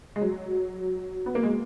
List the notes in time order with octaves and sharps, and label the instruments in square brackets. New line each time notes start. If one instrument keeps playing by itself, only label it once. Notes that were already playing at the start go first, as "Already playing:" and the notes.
[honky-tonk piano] G#3
F#3
B3
A#3
G#3